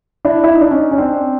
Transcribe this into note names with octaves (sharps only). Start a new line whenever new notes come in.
D4 E4
E4
D#4
D4
C#4 D#4
C#4
C4 D4